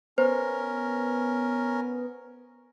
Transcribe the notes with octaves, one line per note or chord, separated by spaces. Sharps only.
B3 C#4 A#4 C5